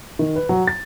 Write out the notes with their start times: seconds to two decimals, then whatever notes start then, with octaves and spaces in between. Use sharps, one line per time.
0.19 D#3
0.36 B4
0.49 F#3
0.67 A6